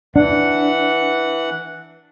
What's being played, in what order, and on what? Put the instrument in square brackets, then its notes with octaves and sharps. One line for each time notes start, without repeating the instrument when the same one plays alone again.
[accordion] E3 F#5 [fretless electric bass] D4